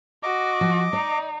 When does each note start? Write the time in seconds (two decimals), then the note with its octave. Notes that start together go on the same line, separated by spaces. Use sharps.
0.23 F#4 D#5 D6
0.61 F3
0.93 D#4 D5